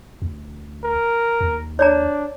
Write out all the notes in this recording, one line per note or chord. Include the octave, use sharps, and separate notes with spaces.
D2
A#4
D#2
D4 C#5 D5 A#5